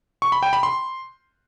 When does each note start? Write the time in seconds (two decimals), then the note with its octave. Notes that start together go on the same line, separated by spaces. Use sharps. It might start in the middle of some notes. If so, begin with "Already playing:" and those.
0.22 C#6
0.32 B5
0.43 G5
0.53 B5
0.63 C6